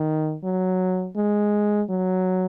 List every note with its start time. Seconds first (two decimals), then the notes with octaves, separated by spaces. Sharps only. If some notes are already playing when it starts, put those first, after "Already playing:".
Already playing: D#3
0.44 F#3
1.16 G#3
1.89 F#3